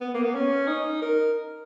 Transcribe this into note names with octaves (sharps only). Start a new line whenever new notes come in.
B3
A#3
B3
C#4
D#4
A#4